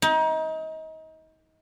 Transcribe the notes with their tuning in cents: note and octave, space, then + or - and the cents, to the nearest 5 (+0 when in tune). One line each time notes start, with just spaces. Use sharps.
D#4 +30